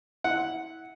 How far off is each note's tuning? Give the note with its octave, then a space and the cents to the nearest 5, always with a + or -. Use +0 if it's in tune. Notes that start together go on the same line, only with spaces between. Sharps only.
E4 -20 F#5 +0